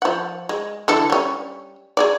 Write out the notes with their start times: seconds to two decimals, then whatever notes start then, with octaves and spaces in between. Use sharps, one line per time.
0.02 F3 F#5
0.49 G#3
0.88 D3 E3 A4
1.10 G3 C#4
1.97 G#4 A4 D5